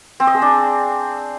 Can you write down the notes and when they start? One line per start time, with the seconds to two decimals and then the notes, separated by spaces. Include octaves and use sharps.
0.20 C4
0.27 D#5
0.34 G#4
0.42 D4